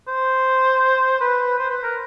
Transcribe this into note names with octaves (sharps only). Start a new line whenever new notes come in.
C5
B4
C5
B4
A#4